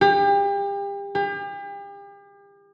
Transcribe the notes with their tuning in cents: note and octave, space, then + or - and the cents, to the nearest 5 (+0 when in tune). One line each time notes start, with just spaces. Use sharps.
G4 +35
G4 +40